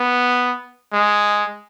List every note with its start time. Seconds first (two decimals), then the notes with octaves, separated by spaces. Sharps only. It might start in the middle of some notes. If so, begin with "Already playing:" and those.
Already playing: B3
0.93 G#3